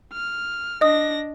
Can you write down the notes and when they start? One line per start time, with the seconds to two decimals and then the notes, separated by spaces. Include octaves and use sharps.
0.13 F6
0.81 D4 D#5 D#6 A#6